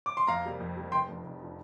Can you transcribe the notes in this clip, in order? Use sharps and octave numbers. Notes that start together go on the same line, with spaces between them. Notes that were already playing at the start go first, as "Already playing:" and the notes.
D6
C6
F2 F5 A#5
C3 G3 A#3
F2
C3 G3 A#3
F1 G5 C6
F2 F3 D4
F1
F3 D4